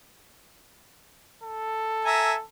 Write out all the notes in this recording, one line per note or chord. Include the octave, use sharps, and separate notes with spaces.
A4
E5 G#5 A#5